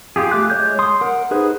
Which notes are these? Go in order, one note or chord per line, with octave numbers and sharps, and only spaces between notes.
F4 G4 G#4
A3 D6 F#6
G#3 C#5 G6
C6 D#6
A#4 F#5
D#4 G#4 B4 C5